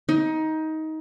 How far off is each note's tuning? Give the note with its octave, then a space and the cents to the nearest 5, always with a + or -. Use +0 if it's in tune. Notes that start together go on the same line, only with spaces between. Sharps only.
D#4 +20